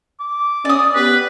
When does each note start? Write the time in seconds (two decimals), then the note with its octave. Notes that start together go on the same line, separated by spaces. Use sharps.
0.20 D6
0.65 C#4 D5 D#6
0.95 B3 G4 B4